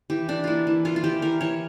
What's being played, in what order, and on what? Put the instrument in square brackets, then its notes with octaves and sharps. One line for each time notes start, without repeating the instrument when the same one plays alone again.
[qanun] E3 G4
E3 D4
A#3 E4 F4
E3
E3 F4
F4
E3 G4
E3 A#4
E3 C#5